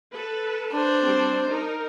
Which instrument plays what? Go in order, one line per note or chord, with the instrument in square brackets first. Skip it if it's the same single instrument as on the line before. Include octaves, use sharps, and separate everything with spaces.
[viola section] A4 B4
[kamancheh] D4 C5
[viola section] G3 C4
D#4 A#4